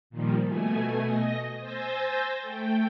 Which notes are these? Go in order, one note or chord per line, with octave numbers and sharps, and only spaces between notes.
A#2 D#3 F3 G3
B2 A3 G#5
D#5 A#6
C5 G#5 E6 G6 A6 A#6
A3 G5